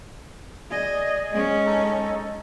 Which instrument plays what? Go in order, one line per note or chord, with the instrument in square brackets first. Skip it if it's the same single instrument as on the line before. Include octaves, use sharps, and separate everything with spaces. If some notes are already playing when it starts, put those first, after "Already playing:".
[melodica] G#4 G#5 [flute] D5 [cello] D#5
[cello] G#3 C#4 [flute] D#5
[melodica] D#4 A4